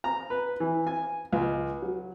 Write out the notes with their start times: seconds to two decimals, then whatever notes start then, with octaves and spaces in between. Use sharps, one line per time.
0.04 A#5
0.30 B4
0.60 E3
0.87 G#5
1.33 C#2
1.82 F#3